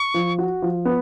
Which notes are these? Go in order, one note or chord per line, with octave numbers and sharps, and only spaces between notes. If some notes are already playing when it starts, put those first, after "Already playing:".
Already playing: C#6
F3
F#4
F3
B3